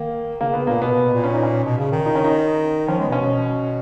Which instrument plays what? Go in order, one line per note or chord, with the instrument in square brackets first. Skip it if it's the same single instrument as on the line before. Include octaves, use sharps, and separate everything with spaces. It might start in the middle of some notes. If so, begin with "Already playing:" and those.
Already playing: [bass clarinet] D#3 [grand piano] A#3
[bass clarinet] C#3 [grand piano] A#3
[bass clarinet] C#3 [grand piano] B3
[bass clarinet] A#2 [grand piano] A#3
[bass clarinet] B2 [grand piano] B3
[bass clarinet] B2
B2
A#2
[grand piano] C#4
D#4
C#4
[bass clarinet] B2
C#3
D#3
[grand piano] D#4
C#4
D#4
[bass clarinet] F3 [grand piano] C#4
[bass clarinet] G#3 [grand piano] B3
[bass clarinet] B2
[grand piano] C#4
[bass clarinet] B2